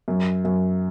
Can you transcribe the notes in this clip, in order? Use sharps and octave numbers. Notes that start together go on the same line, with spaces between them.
F#2
F#2